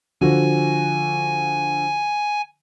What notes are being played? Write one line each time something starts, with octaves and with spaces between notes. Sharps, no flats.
D3 F3 F#4 G#5